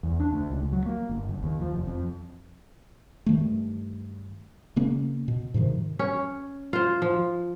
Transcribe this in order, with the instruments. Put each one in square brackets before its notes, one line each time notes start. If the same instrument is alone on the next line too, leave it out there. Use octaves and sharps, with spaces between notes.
[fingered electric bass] E2
D4
D2
C#2
F#3
A#3
G1
F#1
D#2
F3
F1
F2
[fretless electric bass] G2 D#3 A3
C#3 A#3 C#4
B2
G#2 C3 D#3 F3
[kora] C#4
F4 C5
F3